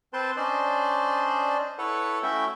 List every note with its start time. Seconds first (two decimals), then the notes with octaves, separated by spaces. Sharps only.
0.13 C4 B4 C5 G5 A5 C6
0.37 C#4 D4 C5 D5 D#5
1.78 E4 A4 B4 C#5 F#5
2.23 A3 C#4 E4 F#4 E5 G5